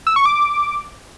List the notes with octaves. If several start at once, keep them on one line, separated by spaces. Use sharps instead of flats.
E6
C#6
D6